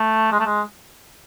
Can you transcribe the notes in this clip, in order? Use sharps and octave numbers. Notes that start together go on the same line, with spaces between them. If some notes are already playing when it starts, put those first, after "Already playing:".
Already playing: A3
G#3
A3
G#3